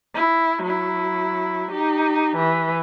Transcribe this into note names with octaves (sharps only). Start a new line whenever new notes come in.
E4
F#3 E4
D#4 G4
E3